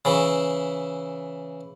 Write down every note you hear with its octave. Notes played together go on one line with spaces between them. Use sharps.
C#3 E3